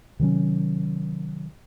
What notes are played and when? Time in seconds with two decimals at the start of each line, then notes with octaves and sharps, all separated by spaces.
0.19 C3 D#3 F#3 C#4